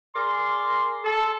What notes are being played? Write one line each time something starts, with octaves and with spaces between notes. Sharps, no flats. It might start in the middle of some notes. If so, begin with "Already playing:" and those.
G#4 A#4 D5 C6
A4